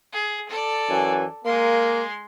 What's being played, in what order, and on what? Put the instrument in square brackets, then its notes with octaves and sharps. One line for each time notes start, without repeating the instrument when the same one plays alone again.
[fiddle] G#4
A4 D5
[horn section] F#2 E3 G#5
[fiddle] G#3 C6 [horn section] A#3